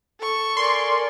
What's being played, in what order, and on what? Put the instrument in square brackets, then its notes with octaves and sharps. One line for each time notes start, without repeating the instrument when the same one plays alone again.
[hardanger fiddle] A4 C#6
[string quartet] A#4 D5 G#5 [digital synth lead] C6